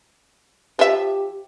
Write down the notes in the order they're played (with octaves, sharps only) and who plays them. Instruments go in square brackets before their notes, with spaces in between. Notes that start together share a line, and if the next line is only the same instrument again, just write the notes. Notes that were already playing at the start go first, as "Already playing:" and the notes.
[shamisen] F3 E5 [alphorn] G4